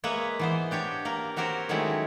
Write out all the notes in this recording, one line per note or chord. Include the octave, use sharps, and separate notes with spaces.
G#3 A#3 B4 C#5 E5
E3 B3 C5
D4 G4 C#5 G5
A#3 A#4
C4 F#4 G4 A#4 C5 C#5
D#3 F#3 G#3 A3 C#4 E4